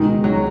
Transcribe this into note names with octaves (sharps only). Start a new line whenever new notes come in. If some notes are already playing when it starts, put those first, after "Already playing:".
Already playing: C#2 B2 D#3 G#3 D#4
F#3